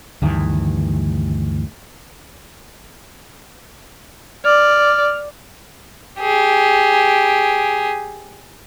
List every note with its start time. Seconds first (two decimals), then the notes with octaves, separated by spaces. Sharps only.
0.22 D2 G2 D#3 E3
4.45 D5 F6
6.20 G4 G#4